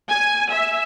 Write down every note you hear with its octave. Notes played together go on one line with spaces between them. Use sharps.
G#5
E5